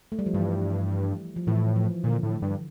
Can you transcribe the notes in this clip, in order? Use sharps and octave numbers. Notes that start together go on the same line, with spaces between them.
A3
G3
F3
G2 E3
F3
A2 E3
F3
A#2 D3
A2
G2